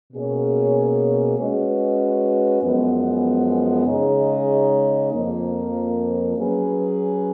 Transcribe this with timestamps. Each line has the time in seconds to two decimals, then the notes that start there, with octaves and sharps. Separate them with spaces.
0.13 B2 A#3 C#4 G#4 C#5
1.37 G#3 C#4 F#4 B4
2.63 F#2 F3 G#3 B3
3.87 C#3 G#3 D#4 G#4 C#5
5.12 F2 F3 A#3
6.37 F#3 C#4 G#4 B4